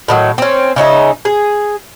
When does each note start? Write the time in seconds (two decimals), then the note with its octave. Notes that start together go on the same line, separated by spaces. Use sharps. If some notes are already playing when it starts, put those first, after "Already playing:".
0.08 A2 D#3 F#3
0.38 C4 C#4
0.76 C#3 C#4 D#4 E5
1.25 G#4